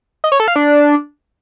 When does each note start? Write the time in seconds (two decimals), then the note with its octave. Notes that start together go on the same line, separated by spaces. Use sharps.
0.24 D#5
0.32 C#5
0.40 A4
0.48 F5
0.56 D4